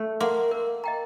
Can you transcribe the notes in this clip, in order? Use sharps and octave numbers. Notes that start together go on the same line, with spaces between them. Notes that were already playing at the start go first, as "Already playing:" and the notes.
Already playing: A3
A#3 F#5 C6
A#4
D#5 G5 A#5